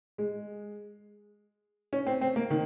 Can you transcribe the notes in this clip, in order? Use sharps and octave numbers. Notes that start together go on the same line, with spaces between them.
G#3
C#4
C4
C4
A#3
D#3